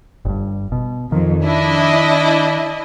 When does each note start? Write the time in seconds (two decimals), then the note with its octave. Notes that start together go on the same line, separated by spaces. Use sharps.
0.25 G1 G2
0.72 B2
1.12 F2 D#3
1.43 D4 E4 D#5